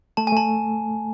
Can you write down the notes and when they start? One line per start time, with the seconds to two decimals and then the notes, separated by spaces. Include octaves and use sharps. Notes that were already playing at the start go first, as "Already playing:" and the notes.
0.17 A3 A5
0.27 G#5
0.32 A3 A5